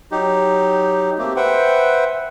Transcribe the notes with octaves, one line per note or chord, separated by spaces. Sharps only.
F#3 D#4 G4
A3 A#3 C4 G4
B4 C5 E5 F#5 G5